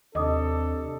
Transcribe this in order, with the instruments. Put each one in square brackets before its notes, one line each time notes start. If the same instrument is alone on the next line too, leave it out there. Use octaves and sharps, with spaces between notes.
[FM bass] D#2 [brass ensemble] C3 D4 A4 [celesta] D#5 D6 D#6